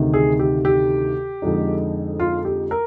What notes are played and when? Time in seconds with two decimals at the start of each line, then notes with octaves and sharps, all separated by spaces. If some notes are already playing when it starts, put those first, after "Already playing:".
Already playing: D2 C3 D#3
0.14 G#4
0.39 G4
0.65 G4
1.42 F2 D3 G#3 D#4
2.20 F4
2.45 G4
2.71 A#4